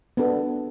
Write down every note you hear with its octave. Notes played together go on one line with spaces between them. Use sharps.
B3 D4 A4